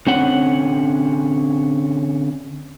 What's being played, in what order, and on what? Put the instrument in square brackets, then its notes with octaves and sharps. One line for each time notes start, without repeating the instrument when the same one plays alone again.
[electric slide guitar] D3 C4 C#4 F#5